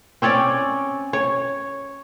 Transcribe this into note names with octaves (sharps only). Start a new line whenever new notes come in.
C4 C#4 C#5 D5
C#5